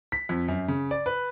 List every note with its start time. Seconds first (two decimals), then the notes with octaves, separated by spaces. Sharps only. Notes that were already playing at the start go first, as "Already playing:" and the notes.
0.12 B6
0.29 F2
0.48 F#2
0.68 C#3
0.91 D5
1.06 B4